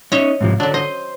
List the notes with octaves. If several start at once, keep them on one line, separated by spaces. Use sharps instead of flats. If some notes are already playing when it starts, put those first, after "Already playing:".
C#4 D#4 C#5 D#5 E5
G#2 C3 F3
D3 F#3 D4
C5 D#5